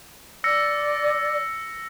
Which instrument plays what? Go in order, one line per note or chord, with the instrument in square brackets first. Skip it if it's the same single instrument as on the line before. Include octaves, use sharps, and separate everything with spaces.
[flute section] D5 [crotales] E6 A#6 C#7